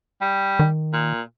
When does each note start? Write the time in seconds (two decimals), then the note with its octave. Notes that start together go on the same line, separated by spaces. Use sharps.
0.21 G3
0.59 D#3
0.93 A#2